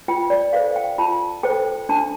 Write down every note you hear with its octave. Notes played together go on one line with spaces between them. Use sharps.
F4 G5
D5
A4 C5 F5
G5
F4 A5
A4 C5 G5
D4 A5